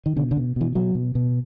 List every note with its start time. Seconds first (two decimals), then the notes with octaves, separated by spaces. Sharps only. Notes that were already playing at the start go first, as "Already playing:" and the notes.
0.06 D#3
0.16 B2 D3
0.31 D3
0.37 B2
0.56 B2 E3
0.75 B2 F#3
0.95 B2
1.15 B2